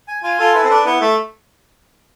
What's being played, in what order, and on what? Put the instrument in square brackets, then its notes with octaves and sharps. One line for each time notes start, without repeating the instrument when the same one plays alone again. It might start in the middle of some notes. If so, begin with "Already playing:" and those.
[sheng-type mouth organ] G#5
[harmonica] F4 [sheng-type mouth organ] G#5
[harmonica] F4 [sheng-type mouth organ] A4
[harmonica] E4 [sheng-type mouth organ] B4
[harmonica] C4
[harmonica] D4 [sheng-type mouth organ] B4
[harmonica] B3 [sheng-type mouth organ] E4
[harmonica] A3 [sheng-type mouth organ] E5